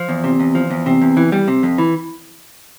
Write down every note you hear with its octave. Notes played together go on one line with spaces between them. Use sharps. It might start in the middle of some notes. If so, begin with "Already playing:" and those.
Already playing: F3
E2
C3
E2
F3
E2
C3
E2
E3
G3
C3
F2
E3